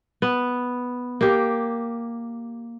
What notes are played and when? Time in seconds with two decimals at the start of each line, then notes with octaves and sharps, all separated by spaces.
0.22 B3
1.21 A#3 G4